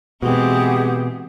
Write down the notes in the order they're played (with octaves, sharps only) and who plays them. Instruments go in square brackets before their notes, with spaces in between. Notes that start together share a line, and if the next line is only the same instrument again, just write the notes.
[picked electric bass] B2 [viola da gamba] E3 G#3 C4 [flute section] G4 G#4 F#5